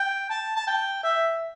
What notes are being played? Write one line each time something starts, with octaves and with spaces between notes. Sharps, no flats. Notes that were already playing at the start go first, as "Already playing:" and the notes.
Already playing: G5
A5
A5
G5
E5